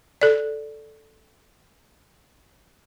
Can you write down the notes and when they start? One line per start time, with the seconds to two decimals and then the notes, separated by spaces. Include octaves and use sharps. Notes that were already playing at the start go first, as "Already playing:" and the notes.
0.21 A4 D5